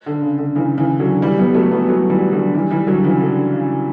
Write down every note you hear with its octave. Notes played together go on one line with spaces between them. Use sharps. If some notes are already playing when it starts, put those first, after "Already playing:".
D3
C#3
D3
C#3 E3
C#3 E3
D3 F#3
E3 G3
G3 B3
F#3 A3
G3 B3
F#3 A3
E3 G3
D3 F#3
E3 G3
E3 G3
D3 F#3
C#3 E3
D3
C#3